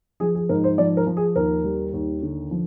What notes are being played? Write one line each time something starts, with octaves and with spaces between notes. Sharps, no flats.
F3 G#4
G#4
G#2 A#4
C5
F3 D5
A#4
F3
G#4
D#2 A#4
G3
D#2
D3
F3